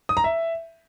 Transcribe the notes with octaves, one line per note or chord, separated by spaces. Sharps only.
D#6
A#5
E5